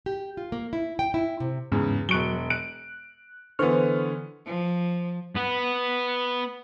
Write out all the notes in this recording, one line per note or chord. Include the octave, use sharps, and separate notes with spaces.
G4
F4
A#3
E4
G5
E4
C3
E2 G#2 C#3
E1 F#3 C#6 F#6 D7 G7
F#6 D7
D3 E3 B3 C5 C#6 F6
F3
B3